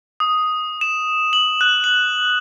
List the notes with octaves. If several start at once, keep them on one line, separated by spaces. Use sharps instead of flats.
D#6
E7
F#7
F#6
F#7